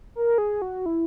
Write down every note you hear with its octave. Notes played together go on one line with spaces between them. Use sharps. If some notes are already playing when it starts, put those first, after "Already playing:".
A#4
G#4
F#4
E4